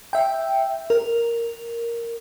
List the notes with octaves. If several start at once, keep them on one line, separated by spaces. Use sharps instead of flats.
E5 G5
A#4